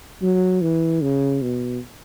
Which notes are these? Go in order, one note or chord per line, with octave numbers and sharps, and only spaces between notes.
F#3
E3
C#3
B2